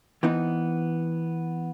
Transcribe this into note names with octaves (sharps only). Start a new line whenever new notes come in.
E3 B3 C4 D#4